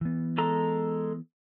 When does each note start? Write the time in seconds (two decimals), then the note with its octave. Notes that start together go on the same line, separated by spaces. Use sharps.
0.01 E3 B3
0.38 G#3 A4 A#5